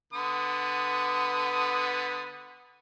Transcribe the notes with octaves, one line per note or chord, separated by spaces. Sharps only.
D3 B3 D#6